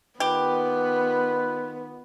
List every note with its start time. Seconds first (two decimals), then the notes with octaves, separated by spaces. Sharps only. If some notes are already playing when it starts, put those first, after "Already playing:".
0.20 D#3 B3 F4 G4 B4